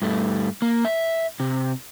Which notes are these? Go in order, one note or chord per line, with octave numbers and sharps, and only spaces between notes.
G2 A3
A#3
E5
C3